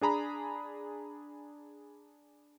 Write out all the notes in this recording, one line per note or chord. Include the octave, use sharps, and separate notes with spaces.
D4 G#4 A#5 B5